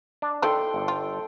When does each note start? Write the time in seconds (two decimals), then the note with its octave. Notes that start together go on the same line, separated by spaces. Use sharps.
0.22 D4
0.42 D#3 F3 E4 A4 G5 C6
0.74 G1
0.88 F4